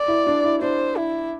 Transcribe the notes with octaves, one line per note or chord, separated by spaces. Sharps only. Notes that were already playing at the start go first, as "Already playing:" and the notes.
Already playing: D5
E4
D4
E4
D4 C5
E4